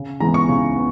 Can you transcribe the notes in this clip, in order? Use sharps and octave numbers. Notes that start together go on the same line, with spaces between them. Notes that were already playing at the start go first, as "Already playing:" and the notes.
Already playing: C#3
E3 G#3 B3 A#5
C#6
C#3
B3